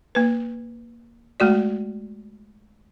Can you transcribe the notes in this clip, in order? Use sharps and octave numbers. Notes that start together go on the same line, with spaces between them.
A#3 B4
G#3 A3 F#4 D5